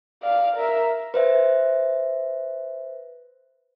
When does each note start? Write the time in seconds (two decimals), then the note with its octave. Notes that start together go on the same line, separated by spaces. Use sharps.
0.23 D5 F5
0.56 A#4 E5
1.14 B4 C5 E5